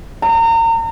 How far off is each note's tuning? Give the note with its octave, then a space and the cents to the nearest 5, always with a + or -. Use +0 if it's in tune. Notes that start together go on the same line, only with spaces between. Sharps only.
A#5 -35